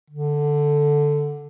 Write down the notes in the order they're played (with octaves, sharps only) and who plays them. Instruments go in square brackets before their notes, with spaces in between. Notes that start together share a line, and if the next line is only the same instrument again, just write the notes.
[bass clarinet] D3